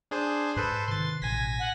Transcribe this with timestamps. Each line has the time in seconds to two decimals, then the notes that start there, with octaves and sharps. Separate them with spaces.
0.11 D4 G#4 C5
0.56 G#2 A4 B4 C5 F#6
0.88 C3 D#3 C6 A6
1.22 A1 B2 G#5 G#6 A#6 B6
1.59 F#5